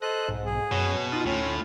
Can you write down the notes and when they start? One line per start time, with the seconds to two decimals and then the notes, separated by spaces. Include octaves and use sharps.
0.02 A4 C5 D#5 F#6
0.28 B1 G#2
0.45 G#4
0.71 F#2 B2 C#5
1.12 D#4 F4 D#6
1.26 D2 A2 C#4